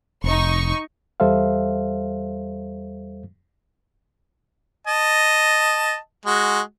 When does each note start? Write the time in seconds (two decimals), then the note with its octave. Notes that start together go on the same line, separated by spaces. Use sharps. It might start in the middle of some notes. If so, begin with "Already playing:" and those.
0.24 F1 D#4 C#6
1.20 E2 G3 A4 C5 E5 F5
4.87 D#5 A5
6.26 G#3 F#4